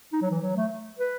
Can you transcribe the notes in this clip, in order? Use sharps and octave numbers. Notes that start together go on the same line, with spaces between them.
D#4
F#3
E3
F#3
A3
B4